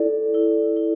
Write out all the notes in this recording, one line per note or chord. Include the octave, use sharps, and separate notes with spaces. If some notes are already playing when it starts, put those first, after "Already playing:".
Already playing: E4 A4 D5
E4
E4